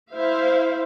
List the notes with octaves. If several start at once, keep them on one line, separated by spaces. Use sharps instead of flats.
E4 C5 E5 F5